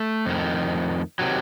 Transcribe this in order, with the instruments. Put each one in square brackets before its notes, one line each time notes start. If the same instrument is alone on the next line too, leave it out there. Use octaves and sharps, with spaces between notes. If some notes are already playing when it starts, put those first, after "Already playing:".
Already playing: [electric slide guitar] A3
F2 D#3
C3 D#3 F#3